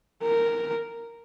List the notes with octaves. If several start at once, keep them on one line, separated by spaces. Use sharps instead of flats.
A#4